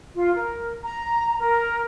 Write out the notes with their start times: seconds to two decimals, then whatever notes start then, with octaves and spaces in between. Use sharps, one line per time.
0.15 F4
0.35 A#4
0.83 A#5
1.40 A#4